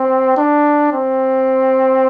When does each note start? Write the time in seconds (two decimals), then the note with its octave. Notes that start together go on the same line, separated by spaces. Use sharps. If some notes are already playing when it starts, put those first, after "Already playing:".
Already playing: C4
0.37 D4
0.93 C4